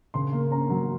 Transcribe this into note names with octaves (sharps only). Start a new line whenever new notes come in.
C#3 C6
A#3
C#4 A#5
F#3